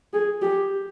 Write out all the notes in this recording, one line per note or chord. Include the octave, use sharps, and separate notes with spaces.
G#4
G4